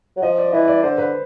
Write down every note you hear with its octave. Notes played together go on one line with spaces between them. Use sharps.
F#3
F3 D#5
D5
E3 D#5
D5
D3 C5
B4